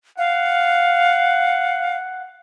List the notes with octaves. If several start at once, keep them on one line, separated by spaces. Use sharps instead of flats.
F5 F#5